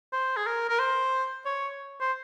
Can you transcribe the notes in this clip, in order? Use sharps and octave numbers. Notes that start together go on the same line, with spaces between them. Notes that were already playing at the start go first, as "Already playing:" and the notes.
C5
G#4
A#4
A#4
C5
C#5
C5